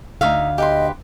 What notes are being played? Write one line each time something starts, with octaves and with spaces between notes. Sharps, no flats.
D2 D#4 F#4 E5 F5
G4 B4 D#5 C6